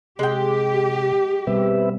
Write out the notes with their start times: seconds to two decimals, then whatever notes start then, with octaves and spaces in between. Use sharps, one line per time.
0.19 C3 G#3 G4 G5
1.47 B2 G3 C4 B4 E5